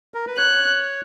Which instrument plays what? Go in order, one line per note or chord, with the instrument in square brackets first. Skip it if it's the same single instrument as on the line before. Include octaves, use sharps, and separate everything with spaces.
[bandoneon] A#4
B4
[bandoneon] C#5 [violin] F#6